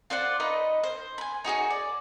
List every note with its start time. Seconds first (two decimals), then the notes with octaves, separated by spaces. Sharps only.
0.10 F4 C5 D5 F#5
0.40 D#4 B4 D#5
0.84 C5
1.18 G#5 B5
1.44 D#4 F#4 G#4 C#5
1.70 D5